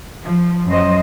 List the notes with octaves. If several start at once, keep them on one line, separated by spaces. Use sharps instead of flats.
F3
F#2 F#3 C5 D#5